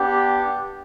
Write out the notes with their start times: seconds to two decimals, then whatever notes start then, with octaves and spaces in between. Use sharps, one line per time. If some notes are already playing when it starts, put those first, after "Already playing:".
Already playing: B3 D4 G4